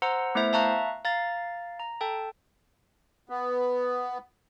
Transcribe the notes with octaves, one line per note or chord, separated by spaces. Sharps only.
C5 F#5 A#5 C6 E6
A3 B3 E4 C5 E5
E5 F5 A5 A#5 C#6 F#6
F5 A#5 A6
A#5
A4 G5 A5
B3